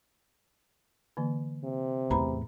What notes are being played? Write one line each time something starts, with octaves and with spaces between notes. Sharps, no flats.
D3 E3 A#3
C3
E2 A2 B4 A#5 B5